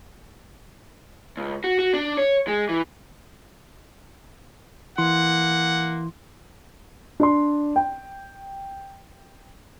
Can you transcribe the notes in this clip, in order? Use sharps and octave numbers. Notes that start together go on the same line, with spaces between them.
C#2
F#4
F#4
D4
C#5
G#3
E3
E3 A#3 E4 F#5 C6
D4 D5 C6
G5